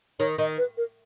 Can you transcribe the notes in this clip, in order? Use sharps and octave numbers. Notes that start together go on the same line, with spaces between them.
D#3 C#5
D#3 D#5
B4
A#4